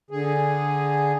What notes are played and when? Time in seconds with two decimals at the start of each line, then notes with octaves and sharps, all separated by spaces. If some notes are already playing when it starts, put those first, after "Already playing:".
0.11 D3 G#4